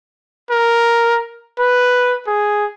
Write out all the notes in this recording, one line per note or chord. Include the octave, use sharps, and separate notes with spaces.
A#4
B4
G#4